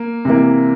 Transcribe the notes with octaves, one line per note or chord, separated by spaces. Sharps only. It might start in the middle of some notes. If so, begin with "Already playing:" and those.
Already playing: A#3
C3 E3 A#3